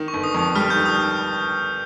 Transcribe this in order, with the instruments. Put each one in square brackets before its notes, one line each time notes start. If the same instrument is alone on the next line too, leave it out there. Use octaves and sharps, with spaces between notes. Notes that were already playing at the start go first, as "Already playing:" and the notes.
Already playing: [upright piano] D#3
[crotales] C#6
[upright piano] G1
[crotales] D#6
[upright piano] F2 [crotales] D#6
[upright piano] G3 [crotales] F6
[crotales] G6
[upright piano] D#3
[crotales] D#6